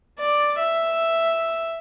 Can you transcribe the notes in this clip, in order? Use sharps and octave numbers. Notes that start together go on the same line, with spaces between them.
D5
E5